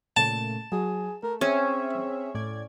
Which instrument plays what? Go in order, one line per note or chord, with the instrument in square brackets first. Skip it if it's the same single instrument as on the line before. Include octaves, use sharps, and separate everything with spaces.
[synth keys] A#2 C#3 A3 [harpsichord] A5
[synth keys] F#3 [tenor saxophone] G#4
[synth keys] A3 [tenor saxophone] A#4
[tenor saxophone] C4 [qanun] C#4 [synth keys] G#4 C#5 E5
[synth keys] A2 D5 G#6